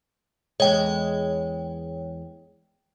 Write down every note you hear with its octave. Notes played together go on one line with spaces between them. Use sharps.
E2 G#3 C#5 G5